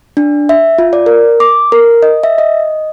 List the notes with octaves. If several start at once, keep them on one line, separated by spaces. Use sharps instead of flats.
D4
E5
F4
D5
A#4
D6
A#4
D#5
E5
D#5